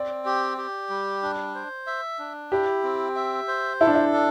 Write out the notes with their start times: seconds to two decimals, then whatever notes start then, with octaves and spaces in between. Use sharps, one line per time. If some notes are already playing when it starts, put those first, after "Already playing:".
Already playing: C4 D5
0.25 G4
0.58 G4
0.89 G3
1.22 D4
1.55 C5
1.87 E5
2.19 D4
2.51 E4 G4
2.83 C4
3.16 E5
3.48 C5
3.81 E4 A4
3.87 D4
3.95 E4
4.13 D4